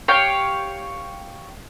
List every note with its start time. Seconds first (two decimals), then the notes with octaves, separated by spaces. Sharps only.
0.08 G4 C#5 F5 G5